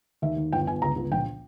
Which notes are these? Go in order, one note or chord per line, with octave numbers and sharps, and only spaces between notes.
D#2 E5
D#2
G1 G5
G1 G#5
C#2 A#5
C#2
A#1 G5